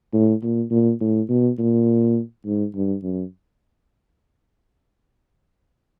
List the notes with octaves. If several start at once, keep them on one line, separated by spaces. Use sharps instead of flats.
A2
A#2
A#2
A2
B2
A#2
G#2
G2
F#2